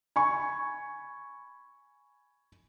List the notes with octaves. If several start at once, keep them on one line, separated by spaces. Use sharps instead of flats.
G#5 B5 C#6